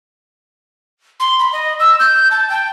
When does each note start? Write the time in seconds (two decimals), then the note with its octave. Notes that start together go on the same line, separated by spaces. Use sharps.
1.20 C6
1.39 B5
1.53 D#5
1.80 E6
2.00 G6
2.31 A5
2.50 G5